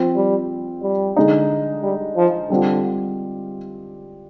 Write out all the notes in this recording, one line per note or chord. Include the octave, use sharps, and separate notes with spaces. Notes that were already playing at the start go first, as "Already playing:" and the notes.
Already playing: F3 C4 F4
G3
G3
D3 G#3 D#4
G3
F3
D3 G3 C4 F4